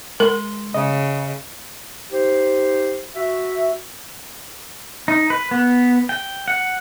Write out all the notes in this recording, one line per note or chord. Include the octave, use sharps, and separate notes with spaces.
G#3 A#4 C6
C#3 D#5
D#4 G4 C5
F#4 E5
D#4
B4
B3
G5
F#5